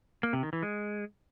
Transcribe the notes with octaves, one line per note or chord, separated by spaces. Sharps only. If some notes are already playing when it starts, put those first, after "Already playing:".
A#3
C3
D#3
E3
G#3